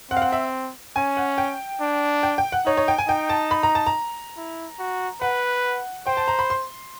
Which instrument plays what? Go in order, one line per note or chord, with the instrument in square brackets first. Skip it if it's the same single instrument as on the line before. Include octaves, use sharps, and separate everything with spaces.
[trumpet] C4 [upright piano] F#5
[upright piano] F5
F#5
E5
[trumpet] C#4 [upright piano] G#5
[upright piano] F#5
G5
[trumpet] D4
[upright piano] G5
G5
F#5
[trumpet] D#4 [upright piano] C#5
[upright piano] C#5
G5
G#5
[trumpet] D#4 [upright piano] G5
[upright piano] A5
B5
A#5
A5
A#5
[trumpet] E4
F#4
[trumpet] B4 [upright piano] F#5
[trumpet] C5 [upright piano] G5
[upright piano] A5
A#5
B5
C6